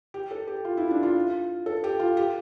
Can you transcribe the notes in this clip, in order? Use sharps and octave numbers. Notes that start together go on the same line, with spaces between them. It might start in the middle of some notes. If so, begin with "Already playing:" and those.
G4
A4
G4
F4
E4
D4
F4
A4
G4
F4
G4